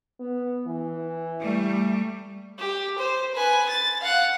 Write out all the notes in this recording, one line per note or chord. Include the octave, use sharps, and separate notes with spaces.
B3
E3
G3 A3
G4
C5
B4 G#5
A6
F5 F#5